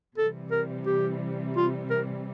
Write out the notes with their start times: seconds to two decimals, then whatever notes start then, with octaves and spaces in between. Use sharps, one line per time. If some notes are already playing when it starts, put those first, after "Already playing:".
0.17 C3 E3 G3 A4
0.51 A#4
0.86 G4
1.56 F4
1.90 A#4